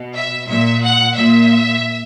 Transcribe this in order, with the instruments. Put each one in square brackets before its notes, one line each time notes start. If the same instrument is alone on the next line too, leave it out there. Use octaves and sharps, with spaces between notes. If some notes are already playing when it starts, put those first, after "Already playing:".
Already playing: [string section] B2
E5
A#2 E5
F#5
A#2 E5